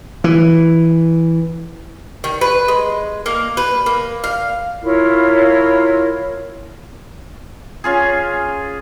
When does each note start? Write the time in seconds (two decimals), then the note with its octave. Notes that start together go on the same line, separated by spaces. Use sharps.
0.24 E3
2.24 D#3
2.41 B4
2.68 G#3
3.26 A#3
3.57 B4
3.86 A#3
4.24 F5
4.82 E4 F4 A#4 C#5
7.84 C#4 F4 G#4